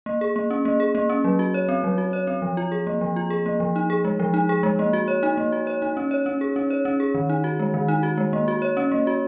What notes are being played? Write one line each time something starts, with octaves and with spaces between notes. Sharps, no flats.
A#3
G#4
A#3
C#4
A#3
G#4
A#3
C#4
F#3
F#4
C#5
C4
F#3
F#4
C#5
C4
F3
F4
G#4
A#3
F3
F4
G#4
A#3
F3
D#4
G#4
G#3
F3
D#4
G#4
G#3
A#3
F#4
C#5
D#4
A#3
F#4
C#5
D#4
C#4
C#5
C#4
G#4
C#4
C#5
C#4
G#4
D#3
D#4
F#4
G#3
D#3
D#4
F#4
G#3
A#3
F#4
C#5
C#4
A#3
F#4